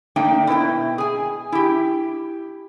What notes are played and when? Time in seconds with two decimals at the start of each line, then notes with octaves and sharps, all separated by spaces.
0.16 A3 A#3 D4 D#4 G5
0.47 B2 E4 C5 G5
0.98 G#4 G#5
1.52 E4 G4